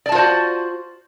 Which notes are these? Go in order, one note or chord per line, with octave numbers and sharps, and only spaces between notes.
F4 F#4 C5 D5 A5